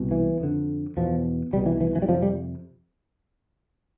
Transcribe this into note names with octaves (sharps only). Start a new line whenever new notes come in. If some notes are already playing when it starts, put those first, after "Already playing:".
Already playing: C2 B2
E3
F2 D3
E2 B2 F3
C2 B2 G3
E3
E3
E3
G3
F2 C3 F3
G3